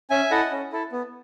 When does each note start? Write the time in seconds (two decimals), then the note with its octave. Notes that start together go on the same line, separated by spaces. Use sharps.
0.10 C#4 E5 G#5
0.31 E4 A4 D#5 F#5
0.51 C#4
0.72 E4 A4
0.92 B3